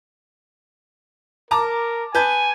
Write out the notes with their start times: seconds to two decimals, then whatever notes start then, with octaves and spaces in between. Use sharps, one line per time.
1.51 A#4 A5 A#5 D6
2.15 B4 G#5 A5 G6